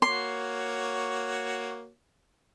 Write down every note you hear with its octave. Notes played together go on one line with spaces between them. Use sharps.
A#3 F#4 C#5 C6